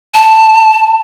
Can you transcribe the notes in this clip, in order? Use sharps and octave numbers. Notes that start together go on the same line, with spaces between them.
A5